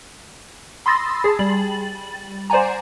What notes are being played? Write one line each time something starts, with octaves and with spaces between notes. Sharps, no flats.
B5 C6 D#6 E6 A6 A#6
G#4 A5
G3 A6 F#7
C5 D5 F#5 G#5 A#5